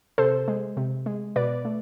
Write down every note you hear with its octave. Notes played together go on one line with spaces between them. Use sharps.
C3 A4 C5
G#3
C3
G#3
B2 B4 D5
A3